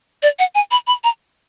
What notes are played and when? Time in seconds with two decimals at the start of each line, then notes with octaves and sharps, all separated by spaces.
0.23 D5
0.39 F#5
0.55 G#5
0.71 B5
0.87 B5
1.04 A#5